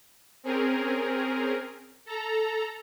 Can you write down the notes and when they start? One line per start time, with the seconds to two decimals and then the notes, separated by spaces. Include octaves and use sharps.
0.44 C4 C#4 G#4 A#4
2.06 A4 A#5